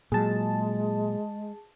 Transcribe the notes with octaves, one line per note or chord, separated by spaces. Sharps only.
A#2 F#3 G#3 G#4 A5